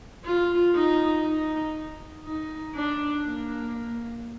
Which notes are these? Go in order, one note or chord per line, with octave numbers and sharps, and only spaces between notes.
F4
D#4
D#4
D#4
D4
A#3